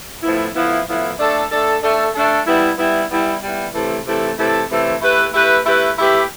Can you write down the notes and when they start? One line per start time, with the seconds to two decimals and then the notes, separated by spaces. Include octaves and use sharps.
0.23 A2 F3 B3 E4
0.55 A2 F3 B3 E4
0.87 A2 F3 B3 E4
1.19 A3 D4 A4
1.51 A3 D4 A4
1.83 A3 D4 A4
2.15 A3 D4 A4
2.47 G3 B3 E4
2.78 G3 B3 E4
3.10 G3 B3 E4
3.42 G3 B3 E4
3.74 C3 E3 A3 E4 A4
4.06 C3 E3 A3 E4 A4
4.38 C3 E3 A3 E4 A4
4.70 C3 E3 A3 E4 A4
5.02 A3 E4 G4 B4
5.33 A3 E4 G4 B4
5.65 A3 E4 G4 B4
5.97 A3 E4 G4 B4